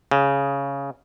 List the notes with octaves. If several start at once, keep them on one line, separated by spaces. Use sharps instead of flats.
C#3